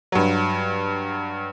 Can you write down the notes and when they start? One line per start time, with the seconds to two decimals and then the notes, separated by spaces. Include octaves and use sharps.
0.12 G2 F#3